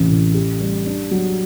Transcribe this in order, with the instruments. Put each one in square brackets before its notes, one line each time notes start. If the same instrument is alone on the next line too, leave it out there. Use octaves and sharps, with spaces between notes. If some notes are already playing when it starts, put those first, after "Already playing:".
Already playing: [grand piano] A1 C3 E3
A2
G4
G3
D4
F#3